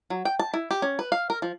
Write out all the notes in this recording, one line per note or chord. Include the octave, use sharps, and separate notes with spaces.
F#3
G5
A5
E4
G4
C#4
B4
F5
A#4
F3